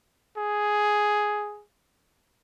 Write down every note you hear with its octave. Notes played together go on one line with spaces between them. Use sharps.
G#4